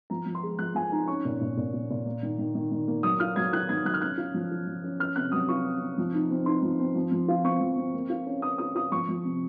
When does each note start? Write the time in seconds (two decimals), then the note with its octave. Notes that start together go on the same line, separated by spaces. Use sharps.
0.10 F3 A#5
0.26 F3
0.35 C6
0.43 G#3
0.59 F3 F#6
0.75 F3 G#5
0.92 D#4 A#5
1.08 C#4 C#6
1.25 A#2
1.41 A#2
1.57 A#2
1.74 A#2
1.90 A#2
2.06 A#3
2.23 D#3
2.39 D#3
2.55 D#3
2.72 D#3
2.88 A#3
3.03 F#3 D#6
3.20 F4 F6
3.36 F#3 G#6
3.53 F4 F#6
3.69 D#3 G#6
3.85 F#3 F#6
3.94 F6
4.01 C#4 F#6
4.17 F4
4.34 F3
4.51 F4
4.67 F3
4.84 C#4
4.99 C#4 F6
5.16 C3 F#6
5.32 F#3 D#6
5.49 F4 C#6
5.64 C#4
5.81 C3
5.98 F3
6.14 D#4
6.30 C4
6.46 D#4 C6
6.62 F3
6.80 C4
6.95 F3
7.12 F3
7.28 F4
7.44 C4 C#6
7.61 F3
7.77 C4
7.94 A#3
8.10 F4
8.26 C#4
8.42 C#4 D#6
8.58 F4 D#6
8.75 F4 D#6
8.92 F3 C#6
9.08 F3
9.25 C3